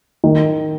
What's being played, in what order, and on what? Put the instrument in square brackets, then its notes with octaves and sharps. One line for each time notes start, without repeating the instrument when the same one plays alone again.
[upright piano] D#3